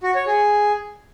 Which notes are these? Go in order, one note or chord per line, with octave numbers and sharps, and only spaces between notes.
F#4
C#5
G#4